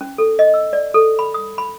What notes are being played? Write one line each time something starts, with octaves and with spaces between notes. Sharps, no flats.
C#4
A4
D#5
E6
D5
A4
B5
D#6
B5